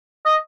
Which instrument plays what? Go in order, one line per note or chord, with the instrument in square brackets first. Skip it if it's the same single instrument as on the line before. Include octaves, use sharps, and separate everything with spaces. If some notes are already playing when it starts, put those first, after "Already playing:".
[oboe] D#5